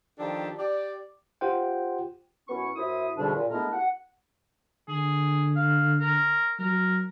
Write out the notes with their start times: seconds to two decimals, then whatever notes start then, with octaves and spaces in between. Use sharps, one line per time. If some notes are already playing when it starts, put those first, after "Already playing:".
0.18 D#3 F3 D4 G4 A4
0.57 G4 D5
1.41 F4 G4 C5 F#5 G5
2.49 F#2 B3 C#4 E4 C#6
2.76 F#2 E4 C5 E5 D#6
3.18 E2 G#2 B2 D3 G3 D4
3.36 A#2
3.50 G#3 A3 B3 D4 E4 A#4
3.73 F#5
4.88 D3 G#4
5.56 F5
6.00 A#4
6.59 F#3 A#4